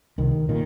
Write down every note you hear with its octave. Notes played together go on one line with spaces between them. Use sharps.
C2 D#3
A#2 D#3